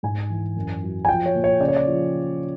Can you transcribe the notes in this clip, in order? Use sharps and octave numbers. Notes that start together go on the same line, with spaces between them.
G#2 G#5
E3
F#2
F#3
G#5
F3 G5
C#5
A#2
C#5
C#3 D5
C#5
D5
F3